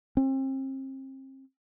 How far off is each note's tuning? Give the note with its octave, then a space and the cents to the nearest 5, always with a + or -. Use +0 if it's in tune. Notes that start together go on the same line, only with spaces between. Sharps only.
C4 +35